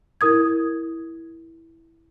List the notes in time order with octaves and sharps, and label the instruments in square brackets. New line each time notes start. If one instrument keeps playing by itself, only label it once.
[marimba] E4 A#4 D#6 G#6